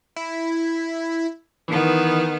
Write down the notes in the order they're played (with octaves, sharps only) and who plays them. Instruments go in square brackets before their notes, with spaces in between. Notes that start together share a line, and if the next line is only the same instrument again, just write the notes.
[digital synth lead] E4
[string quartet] D#3 B3 [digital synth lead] E3